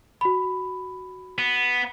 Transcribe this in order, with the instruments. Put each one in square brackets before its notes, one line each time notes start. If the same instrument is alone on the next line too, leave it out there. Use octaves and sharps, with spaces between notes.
[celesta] F#4 B5
[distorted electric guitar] B3